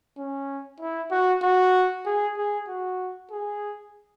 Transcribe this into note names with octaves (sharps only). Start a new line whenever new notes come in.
C#4
E4
F#4
F#4
G#4
G#4
F#4
G#4